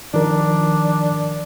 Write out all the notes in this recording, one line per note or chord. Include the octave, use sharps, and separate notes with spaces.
D#3 F3 D4 A#4